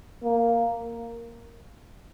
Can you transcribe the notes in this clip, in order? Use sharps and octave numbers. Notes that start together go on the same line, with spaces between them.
A#3